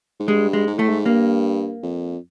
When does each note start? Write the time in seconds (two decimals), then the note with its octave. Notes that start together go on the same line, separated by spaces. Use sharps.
0.20 G#2
0.28 G2 G#3
0.53 G#3
0.67 G#2
0.78 A2 A3
0.89 G#2
1.05 G2 A#3
1.83 F2